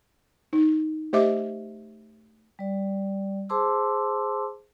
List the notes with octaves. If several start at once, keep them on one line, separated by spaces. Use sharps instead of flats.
D#4
A3 G4 C5 D#5 E5 D6
G3 D5
G#4 C5 A5 C6 D6 E6